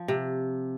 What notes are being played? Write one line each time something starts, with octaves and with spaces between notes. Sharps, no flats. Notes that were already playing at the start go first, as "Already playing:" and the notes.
Already playing: F3
C3